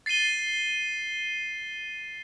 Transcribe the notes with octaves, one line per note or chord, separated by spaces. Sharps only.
A6 C7 D#7 G7